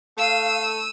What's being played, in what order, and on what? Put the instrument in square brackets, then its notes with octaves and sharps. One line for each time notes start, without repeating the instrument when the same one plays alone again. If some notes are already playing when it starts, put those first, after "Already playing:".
[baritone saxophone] A3 [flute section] F5 [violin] E6 D#7